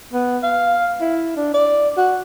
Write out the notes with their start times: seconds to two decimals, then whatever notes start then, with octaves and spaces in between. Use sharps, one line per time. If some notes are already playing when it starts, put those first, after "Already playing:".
0.13 B3
0.43 F5
1.00 E4
1.36 D4
1.54 D5
1.97 F#4